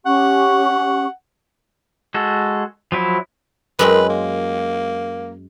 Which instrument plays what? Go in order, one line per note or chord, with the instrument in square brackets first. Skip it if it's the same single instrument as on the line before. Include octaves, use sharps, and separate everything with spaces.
[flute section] C#4 G4 C#6 [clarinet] F#5
[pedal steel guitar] G#3 F#4 A4
F3 F#3 E4
[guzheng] F#2 G#3 C4 [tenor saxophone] B4
[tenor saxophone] A#3